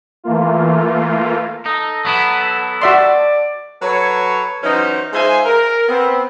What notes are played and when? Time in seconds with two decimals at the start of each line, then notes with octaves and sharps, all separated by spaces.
0.24 E3 A3 A#3 F4
1.66 D#4 A4
2.05 F#3 B3 E4
2.82 F#4 D5 E5 C6
3.82 F#3 A4 B4 C#5
4.63 E3 F#3 C#4 D#4 C5
5.12 G#3 D#4 F4 C5 E5 G#5
5.46 A#4
5.88 B3 C4